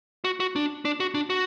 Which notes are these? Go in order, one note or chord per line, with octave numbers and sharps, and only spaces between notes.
F#4
F#4
D4
D4
F#4
D4
F#4